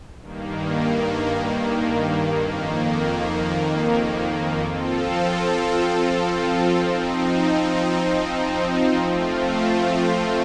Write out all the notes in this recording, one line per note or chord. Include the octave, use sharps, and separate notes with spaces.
G2 D#3 A#3
F2 D#3 A#3
F3 C4 F4 A4
F3 C4 D#4
F3 A3 C4 F4